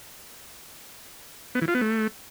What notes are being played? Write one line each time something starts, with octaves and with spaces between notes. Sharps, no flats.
B3
E3
F4
B3
A3